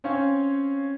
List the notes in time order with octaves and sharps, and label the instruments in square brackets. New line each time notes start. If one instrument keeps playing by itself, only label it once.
[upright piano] C4 C#4 C#5 F5